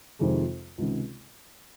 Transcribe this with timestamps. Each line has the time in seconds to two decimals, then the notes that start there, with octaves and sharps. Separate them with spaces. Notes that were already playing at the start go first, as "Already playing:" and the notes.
0.19 F2 C3 D#3 G#3
0.78 C#2 C3 D#3